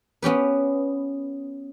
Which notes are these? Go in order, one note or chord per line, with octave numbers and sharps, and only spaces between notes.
B3 C#4 G4 B4